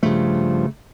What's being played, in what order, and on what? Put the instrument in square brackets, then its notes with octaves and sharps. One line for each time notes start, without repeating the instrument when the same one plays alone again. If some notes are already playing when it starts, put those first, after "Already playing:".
[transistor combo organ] G2 F3 [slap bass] C#3 A3